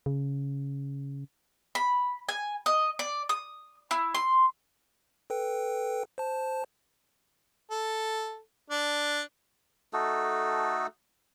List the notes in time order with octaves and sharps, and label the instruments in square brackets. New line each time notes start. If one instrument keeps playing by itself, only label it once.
[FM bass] C#3
[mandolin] B5
G#5
D#5
D5
D#6
E4
C6
[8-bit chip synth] A4 B4 G5
C5 A5
[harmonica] A4
D4
[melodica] A3 D#4 F#4 A4